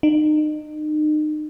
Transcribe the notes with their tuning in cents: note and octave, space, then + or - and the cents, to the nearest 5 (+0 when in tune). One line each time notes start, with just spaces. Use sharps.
D#4 -35